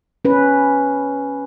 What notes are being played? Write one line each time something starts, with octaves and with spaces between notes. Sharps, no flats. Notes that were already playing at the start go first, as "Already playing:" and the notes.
C#4 B4